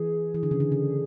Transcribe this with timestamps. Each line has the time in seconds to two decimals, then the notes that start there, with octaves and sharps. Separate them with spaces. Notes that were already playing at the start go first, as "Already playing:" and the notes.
Already playing: E3 G#4
0.34 E3
0.43 D3
0.51 C#3
0.60 D3
0.72 C#3